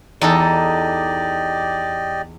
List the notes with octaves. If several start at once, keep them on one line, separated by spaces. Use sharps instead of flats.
E2 D#4 G4 A4 D5 D#5